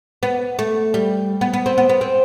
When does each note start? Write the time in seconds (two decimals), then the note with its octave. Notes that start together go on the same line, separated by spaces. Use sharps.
0.23 B3
0.59 A3
0.94 G3
1.41 B3
1.53 B3
1.66 C4
1.78 B3
1.89 B3
2.01 C4